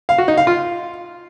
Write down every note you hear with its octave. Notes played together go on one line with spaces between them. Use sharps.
F5
F#4
D#4
F5
F4